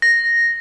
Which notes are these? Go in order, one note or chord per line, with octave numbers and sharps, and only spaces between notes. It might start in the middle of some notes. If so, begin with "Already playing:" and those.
A#6